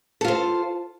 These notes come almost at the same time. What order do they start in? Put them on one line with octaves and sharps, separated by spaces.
A4 F4 C5